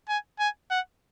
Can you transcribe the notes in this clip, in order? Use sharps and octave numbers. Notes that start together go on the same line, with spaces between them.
G#5
G#5
F#5